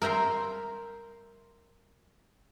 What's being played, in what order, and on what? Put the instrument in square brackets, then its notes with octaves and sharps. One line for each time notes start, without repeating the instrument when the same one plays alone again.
[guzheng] A#4 E5 G5 A#5 C6